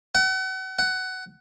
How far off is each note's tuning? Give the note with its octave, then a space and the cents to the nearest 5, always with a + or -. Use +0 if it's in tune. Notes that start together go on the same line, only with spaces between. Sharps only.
F#5 +35
F#5 +15